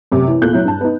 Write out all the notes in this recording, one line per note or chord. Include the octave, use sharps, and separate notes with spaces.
F#2 C3
E3
E2 A#2 F4 A4 F#6 G6
F#3 E4
G2 A5
B3 D#4